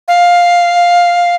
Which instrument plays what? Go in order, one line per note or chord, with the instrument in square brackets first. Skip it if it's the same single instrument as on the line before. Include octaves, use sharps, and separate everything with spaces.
[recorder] F5